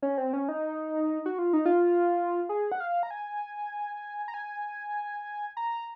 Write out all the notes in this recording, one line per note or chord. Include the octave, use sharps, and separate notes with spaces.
C#4
C4
C#4
D#4
F#4
F4
D#4
F4
G#4
F#5
F5
A#5
G#5
A#5
G#5
A#5